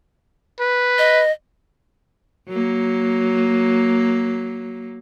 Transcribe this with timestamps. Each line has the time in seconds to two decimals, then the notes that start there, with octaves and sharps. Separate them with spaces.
0.60 B4
0.98 D#5
2.49 F#3 A#3